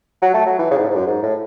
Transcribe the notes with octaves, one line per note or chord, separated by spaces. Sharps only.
F#3
A3
F#3
E3
C#3
G#2
A2
G#2
F#2
G#2
A2